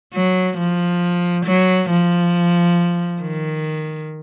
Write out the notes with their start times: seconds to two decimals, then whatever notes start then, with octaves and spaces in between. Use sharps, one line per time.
0.13 F#3
0.57 F3
1.45 F#3
1.90 F3
3.21 D#3